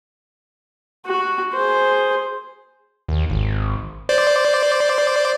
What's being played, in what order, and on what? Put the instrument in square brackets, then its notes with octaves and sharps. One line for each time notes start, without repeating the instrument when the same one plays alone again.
[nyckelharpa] F#4
G#4 C5
[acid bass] D#2
G#1
[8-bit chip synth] C5 D5